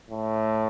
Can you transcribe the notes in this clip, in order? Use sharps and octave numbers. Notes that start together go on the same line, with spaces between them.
A2